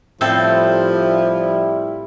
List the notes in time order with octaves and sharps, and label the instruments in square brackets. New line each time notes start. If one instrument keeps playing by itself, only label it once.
[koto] A2 C4 A4 [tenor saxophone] F3 [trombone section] G3 E4